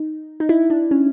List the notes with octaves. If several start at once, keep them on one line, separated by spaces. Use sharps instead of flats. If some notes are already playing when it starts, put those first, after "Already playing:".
Already playing: D#4
D#4
E4
D4
C#4